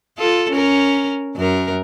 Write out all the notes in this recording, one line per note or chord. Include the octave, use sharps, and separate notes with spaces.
F4 A4
C#4 A#4
F#2 A#4